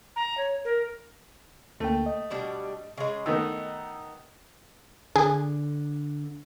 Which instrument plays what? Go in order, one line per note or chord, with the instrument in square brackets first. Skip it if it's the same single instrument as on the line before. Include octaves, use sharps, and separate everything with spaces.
[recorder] A#5
C#5
A#4
[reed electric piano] D2 A#3 G5 [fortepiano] A3
[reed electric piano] D#5
[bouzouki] B2 G3 D4
C#3 G#3
[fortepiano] D#3 A3 B3 [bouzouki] D#4 [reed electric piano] E6
[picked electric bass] D3 [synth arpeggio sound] G#4